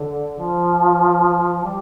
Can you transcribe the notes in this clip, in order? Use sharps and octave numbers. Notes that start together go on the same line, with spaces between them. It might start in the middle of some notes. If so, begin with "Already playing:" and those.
Already playing: D3
F3
G3